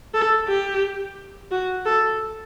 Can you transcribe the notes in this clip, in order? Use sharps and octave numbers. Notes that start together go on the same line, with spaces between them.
A4
G4
F#4
A4